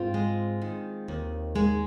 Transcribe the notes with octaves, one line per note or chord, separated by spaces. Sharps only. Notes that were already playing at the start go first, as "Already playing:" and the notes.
Already playing: G#2 C4 F4
G#3
D#3
D#2
G#3